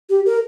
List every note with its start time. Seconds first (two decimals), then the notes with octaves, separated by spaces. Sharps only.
0.09 G4
0.26 A#4